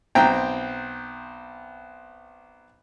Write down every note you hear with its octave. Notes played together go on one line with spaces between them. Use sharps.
B1 C4 G5 A#5